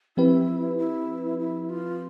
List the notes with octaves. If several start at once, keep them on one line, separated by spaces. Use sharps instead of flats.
F3 C4 E4 G4 B4
E4
E4
F4